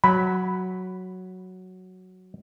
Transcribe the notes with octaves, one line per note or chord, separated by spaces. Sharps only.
F#3 B5